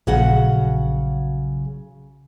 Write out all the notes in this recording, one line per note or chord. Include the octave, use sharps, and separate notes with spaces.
A#1 C#3 F#3 F#4 F#5